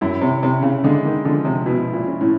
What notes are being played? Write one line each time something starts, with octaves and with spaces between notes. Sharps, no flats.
F#2 E4
C3
C3 C#4
C#3
D3 G#3
D#3
D3 F3
C3
B2 E4
A#2
C#4
A2